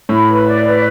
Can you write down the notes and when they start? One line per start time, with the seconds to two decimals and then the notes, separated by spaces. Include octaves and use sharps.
0.09 A2 B5
0.28 B4
0.46 D5
0.64 B4